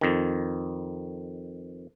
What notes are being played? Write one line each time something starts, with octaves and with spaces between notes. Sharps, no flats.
F2 D#3